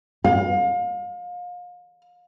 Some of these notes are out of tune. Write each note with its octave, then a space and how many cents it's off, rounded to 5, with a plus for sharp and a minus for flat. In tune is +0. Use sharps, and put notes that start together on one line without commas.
F5 +35